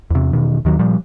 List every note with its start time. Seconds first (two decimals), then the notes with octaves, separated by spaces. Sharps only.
0.10 E2 C3
0.33 E1 B2 D#3
0.65 D#2 D#3 F#3
0.79 A#2 F3 G3